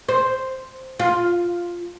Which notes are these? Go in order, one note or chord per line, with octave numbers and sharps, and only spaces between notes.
C5
F4